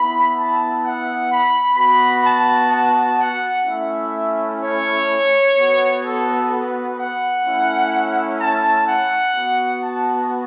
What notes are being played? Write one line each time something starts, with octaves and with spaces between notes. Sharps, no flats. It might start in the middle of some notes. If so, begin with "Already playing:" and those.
Already playing: B3 E4 B5
A5
F#5
B5
B3 F#4 B5
A5
A5
F#5
A3 C#4 E4 E5
C#5
B3 F#4
A4
B4
F#5
A3 C#4 E4
A5
F#5
B3 F#4
A5